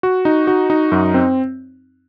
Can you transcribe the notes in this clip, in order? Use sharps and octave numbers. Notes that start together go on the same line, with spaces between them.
F#4
D#4
F#4
D#4
F#2
C4